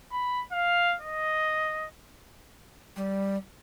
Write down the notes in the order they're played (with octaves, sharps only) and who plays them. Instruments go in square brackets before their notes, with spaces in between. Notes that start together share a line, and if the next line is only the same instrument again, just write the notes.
[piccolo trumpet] B5
F5
D#5
[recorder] G3